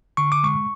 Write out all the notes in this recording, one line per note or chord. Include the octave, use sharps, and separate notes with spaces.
D3 C#6
D6
G#3 C#6